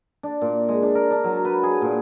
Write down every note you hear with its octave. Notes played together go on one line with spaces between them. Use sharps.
D4
A#2
G#3
D4
A#4
D4
F#3
B4
G#4
A#2